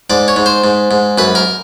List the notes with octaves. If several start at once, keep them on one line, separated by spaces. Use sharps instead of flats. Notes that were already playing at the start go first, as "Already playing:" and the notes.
G#2 D5
C#5
G#2
C5
G#2
G#2
F#2 B4
A#4